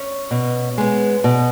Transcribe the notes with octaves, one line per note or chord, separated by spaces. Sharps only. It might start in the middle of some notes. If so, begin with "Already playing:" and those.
Already playing: C#4
B2
G#3 B3
B2